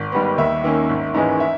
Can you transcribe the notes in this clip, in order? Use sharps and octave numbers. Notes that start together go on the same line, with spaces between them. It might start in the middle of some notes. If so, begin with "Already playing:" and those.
Already playing: G#1
G#2 G3 B3
D#2 E5
D#3 A#3 C#4
G#1
G#2 E3 G#3 C#4
E5